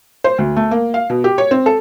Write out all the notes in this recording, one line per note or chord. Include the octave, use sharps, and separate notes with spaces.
C5
D2
A3
A#3
F5
B2
G4
C#5
C4
A4